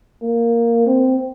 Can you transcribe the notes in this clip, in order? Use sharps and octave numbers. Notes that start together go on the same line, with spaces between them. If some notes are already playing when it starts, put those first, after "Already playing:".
A#3
C4